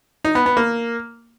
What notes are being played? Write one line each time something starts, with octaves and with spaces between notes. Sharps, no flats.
D#4
B3
B3
A#3